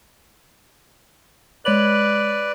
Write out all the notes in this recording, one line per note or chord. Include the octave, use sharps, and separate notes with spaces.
G#3 B4 C#5 D5 F#7